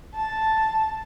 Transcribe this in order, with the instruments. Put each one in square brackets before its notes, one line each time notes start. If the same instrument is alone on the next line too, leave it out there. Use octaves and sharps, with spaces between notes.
[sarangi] A5